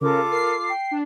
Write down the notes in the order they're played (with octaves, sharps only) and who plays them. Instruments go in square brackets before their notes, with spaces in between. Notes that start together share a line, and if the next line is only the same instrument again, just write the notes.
[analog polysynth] C#3 [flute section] F4 A4 D6 [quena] A#4
[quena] A#4 [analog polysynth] C7
[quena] G5
[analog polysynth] D4